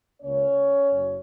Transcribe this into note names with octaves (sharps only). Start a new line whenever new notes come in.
C#2 C#3 A#3 C#4 C#5
F#1 F#2 F#3